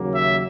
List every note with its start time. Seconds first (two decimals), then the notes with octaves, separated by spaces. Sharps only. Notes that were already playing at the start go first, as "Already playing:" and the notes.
Already playing: D#2 C#3 F#3 A#3
0.12 E5